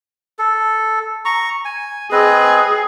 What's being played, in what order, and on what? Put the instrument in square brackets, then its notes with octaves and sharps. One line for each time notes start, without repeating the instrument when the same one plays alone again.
[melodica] A4
A#5 C#6
G#5
[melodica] C4 B4 D#5 [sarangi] G#4